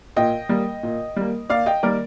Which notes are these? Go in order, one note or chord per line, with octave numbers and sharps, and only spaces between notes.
A#2 D#5 G5
G3 A#3
A#2
G3 A#3
D#2 D5 F5
D#5 G5
D#3 G3 A#3 A#4 D5